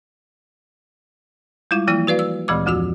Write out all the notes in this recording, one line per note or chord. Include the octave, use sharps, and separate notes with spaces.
G3 G#3 E4 F4
E3 F3 A#3 E4
F#4 B4 D5 F5
E6
D2 A#2 E3 G#3 D6
F2 F3 F4 F#4 E6